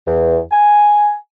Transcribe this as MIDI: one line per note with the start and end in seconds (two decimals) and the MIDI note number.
0.06 0.38 40
0.51 1.15 80